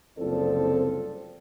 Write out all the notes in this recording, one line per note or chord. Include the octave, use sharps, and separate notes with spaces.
F#1 C2 F3 C4 A4 D5